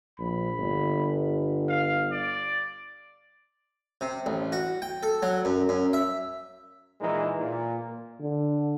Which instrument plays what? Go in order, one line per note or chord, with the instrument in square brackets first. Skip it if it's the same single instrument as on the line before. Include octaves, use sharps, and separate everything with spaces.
[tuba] A#1 [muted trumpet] B5
[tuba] G1
[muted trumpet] F5
D5
[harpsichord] C3
A1
F#4
G5
A4
F#3
F#2
F#2
E5
[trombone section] A#2 E3 G#3 D#4
A#2
[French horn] D3